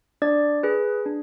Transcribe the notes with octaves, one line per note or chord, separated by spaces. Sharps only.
D4 D5
G#4 B4
D4